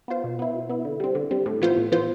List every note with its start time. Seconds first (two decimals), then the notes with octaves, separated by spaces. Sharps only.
0.08 B3 F4 C5
0.24 B2
0.39 B3 E4
0.54 B2
0.69 B3 E4
0.85 D3
1.00 G3 C4
1.15 D3
1.31 G3 C4
1.46 A2
1.62 E3 B3 F4 C5
1.77 A2
1.92 E3 B3 F4 C5